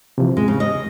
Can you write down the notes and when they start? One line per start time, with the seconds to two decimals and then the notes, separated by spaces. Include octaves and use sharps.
0.18 C3 E3 F3
0.37 E2 G#3
0.48 C#3
0.60 D#5